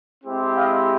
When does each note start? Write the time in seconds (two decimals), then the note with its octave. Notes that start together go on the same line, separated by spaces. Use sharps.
0.25 G#3 C4 E4 G4
0.55 D#5 F5